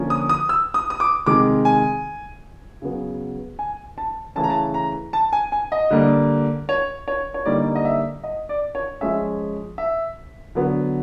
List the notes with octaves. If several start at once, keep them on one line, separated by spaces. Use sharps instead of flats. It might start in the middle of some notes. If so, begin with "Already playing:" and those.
Already playing: D3 F3 A#3 C#4
D#6
D#6
E6
D#6
D#6
D6
C3 D#3 G#3 D6
G#5
C#3 F#3 B3
G#5
A5
C#3 E3 A3 C#4 A5
A#5
A5
A#5
A5
G#5
G#5
D#5
D3 G3 A#3
C#5
C#5
C#5
D3 G3 A#3 D#4 D5
D#5
E5
D#5
D5
C#5
F3 G#3 C#4 E5
E5
D3 F#3 B3